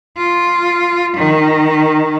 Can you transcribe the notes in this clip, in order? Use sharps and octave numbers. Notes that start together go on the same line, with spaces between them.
F4
D#3